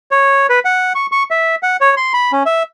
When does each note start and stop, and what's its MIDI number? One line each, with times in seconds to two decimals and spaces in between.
0.11 0.47 73
0.49 0.59 71
0.65 0.93 78
0.95 1.07 85
1.12 1.23 85
1.31 1.55 76
1.63 1.77 78
1.81 1.95 73
1.97 2.13 84
2.13 2.32 83
2.32 2.43 61
2.46 2.63 76